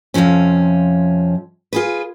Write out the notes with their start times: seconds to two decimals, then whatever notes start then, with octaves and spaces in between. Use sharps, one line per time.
0.14 F2 G#2 C3 F3 C#4
1.73 F4 G#4 B4